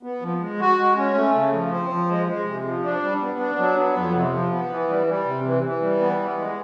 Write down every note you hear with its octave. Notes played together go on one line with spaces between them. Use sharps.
B3
F3
G#3
F#4
G#3
C#4
A3
C#3
F3
C4
F3
G#3
G#3
C3
F3
D4
G3
B3
D4
F#3
B3
F2
C3
F3
B3
E3
G3
G3
C3
E3
E3
G3
B3
E3
G#3